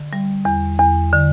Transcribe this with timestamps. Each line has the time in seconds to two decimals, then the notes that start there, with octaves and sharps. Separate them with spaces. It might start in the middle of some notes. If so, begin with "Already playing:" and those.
Already playing: D3
0.13 G3
0.45 E2
0.79 E2
1.13 D3